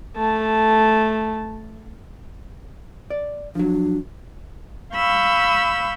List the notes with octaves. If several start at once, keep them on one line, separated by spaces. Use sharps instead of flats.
A3 A5
D5
F3 F#3 D4
F5 B5 C#6 E6 G6